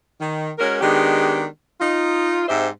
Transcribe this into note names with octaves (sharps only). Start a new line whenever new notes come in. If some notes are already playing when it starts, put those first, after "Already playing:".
D#3
G#3 C#4 F#4 A#4
D#3 G#3 B3 D4 G4
D#4 F4
G#2 C4 G4 C5 E5